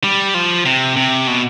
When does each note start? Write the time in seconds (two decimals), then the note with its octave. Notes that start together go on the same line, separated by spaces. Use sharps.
0.04 G3
0.34 F3
0.65 C3
0.97 C3
1.27 B2